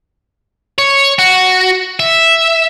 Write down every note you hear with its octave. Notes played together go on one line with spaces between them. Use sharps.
C#5
F#4
E5